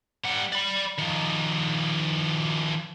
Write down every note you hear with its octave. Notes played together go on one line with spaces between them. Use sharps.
G3 F#5
D5 B5
D#3 F3